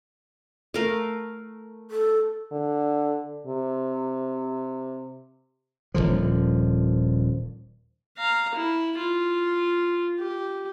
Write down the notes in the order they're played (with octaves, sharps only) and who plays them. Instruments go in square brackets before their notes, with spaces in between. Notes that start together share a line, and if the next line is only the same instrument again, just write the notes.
[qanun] A3 A#4 F5
[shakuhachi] A4
[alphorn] D3
C3
[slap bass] D#1 A#1 D3 F3
[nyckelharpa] F5 A#5
E4
F4
G4